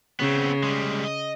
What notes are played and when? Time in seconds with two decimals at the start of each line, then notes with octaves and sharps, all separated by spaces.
0.20 C#3 B3 C4
0.63 G3 G#3
1.05 D#5